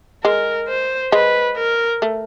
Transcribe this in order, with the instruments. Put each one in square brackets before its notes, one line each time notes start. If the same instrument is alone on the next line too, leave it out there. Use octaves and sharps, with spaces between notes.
[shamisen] G#3 [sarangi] A#4
[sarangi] C5
[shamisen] G#3 [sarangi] B4
[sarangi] A#4
[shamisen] A3